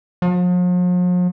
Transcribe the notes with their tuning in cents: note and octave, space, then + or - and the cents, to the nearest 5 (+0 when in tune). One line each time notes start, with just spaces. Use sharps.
F3 +45